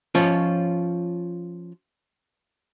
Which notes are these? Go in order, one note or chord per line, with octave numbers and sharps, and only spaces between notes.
F3 C#4 F4 C#5